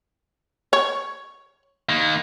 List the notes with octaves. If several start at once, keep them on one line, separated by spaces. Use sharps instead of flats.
C#5
D#3 A#3